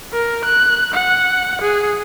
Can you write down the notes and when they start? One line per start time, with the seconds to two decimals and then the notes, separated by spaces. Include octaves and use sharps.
0.13 A#4
0.45 F#6
0.95 F#5
1.62 G#4